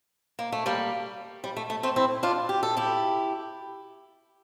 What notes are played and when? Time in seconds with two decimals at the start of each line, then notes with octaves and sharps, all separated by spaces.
0.39 A#3
0.52 A3
0.66 G3 A#3
1.44 G3
1.57 A3
1.70 A3
1.83 A3 C4
1.96 C4 E4
2.23 D4 F4
2.49 G4
2.63 A4
2.77 E4 G4